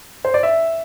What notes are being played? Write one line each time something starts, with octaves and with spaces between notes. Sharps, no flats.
C5
D5
E5